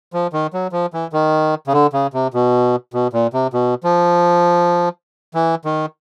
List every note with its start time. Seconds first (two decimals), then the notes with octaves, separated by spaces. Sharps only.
0.13 F3
0.33 D#3
0.53 F#3
0.72 F3
0.93 E3
1.13 D#3
1.67 C#3
1.73 D3
1.93 C#3
2.14 C3
2.34 B2
2.94 B2
3.13 A#2
3.33 C3
3.53 B2
3.84 F3
5.34 E3
5.65 D#3